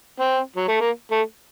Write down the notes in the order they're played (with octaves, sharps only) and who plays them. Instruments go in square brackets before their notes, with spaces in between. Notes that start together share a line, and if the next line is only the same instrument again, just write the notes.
[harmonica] C4
F#3
A3
A#3
A3